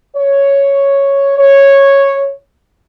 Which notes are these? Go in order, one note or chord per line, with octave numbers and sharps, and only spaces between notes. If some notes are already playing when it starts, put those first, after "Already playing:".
C#5
C#5